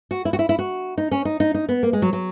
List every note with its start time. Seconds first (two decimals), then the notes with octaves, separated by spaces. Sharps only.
0.11 F#4
0.25 E4
0.33 F#4
0.39 E4
0.49 E4
0.59 F#4
0.98 D#4
1.11 C#4
1.25 D#4
1.40 D#4
1.54 D#4
1.69 B3
1.83 A#3
1.93 G#3
2.02 F#3
2.13 F#3